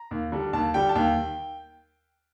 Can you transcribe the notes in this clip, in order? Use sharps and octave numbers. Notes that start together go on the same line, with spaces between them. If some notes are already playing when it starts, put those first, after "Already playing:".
Already playing: A#5
D#2
D3 G3
D#2 A5
D3 G3 G5
A5
D#2 G5